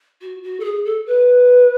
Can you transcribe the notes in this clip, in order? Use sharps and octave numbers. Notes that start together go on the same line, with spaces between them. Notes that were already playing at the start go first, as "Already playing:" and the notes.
F#4
F#4
A4
G#4
A4
B4